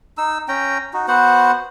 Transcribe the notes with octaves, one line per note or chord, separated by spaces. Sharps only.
D#4 E6
C#4 G5 A#5
D#4 F#4
B3 F#4 C5 F#5